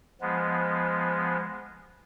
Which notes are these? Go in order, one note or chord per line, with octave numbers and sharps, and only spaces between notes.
F3 G#3 B3